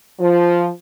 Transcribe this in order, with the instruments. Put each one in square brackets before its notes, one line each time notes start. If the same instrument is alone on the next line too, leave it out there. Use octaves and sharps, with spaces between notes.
[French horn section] F3